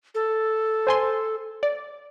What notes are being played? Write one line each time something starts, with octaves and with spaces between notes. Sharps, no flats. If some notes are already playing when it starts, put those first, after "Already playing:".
A4
C5 G#5 C6
D5